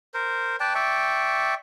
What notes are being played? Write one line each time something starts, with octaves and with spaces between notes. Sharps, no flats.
A#4 C5
B4 D5 G5 A5
D5 E5 G5 C#6